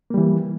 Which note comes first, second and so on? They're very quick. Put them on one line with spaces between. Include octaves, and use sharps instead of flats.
A#3 G3 E3